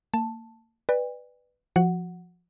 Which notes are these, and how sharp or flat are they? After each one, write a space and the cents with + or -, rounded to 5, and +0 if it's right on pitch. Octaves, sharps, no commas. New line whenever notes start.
A#3 -30 A5 +0
B4 +0 D5 +20 G5 +45
F3 +0 F#4 +0 F#5 +0